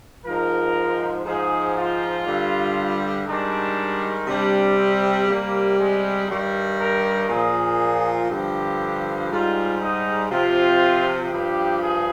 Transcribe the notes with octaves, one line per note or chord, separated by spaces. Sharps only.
G#2 F3 A#4
G#2 F3 G#4
F4
G2 D3 G3
G#2 D#3 G3 D4
C3 G3 D4
C4
C3 G3 A#3
G#3
G2 D#3 G3
A#4
A#2 F3 G#4
G2 D3 F3 G4
G#2 G3 F4
D#4
C3 F3 F4
G2 F3 G4
G#4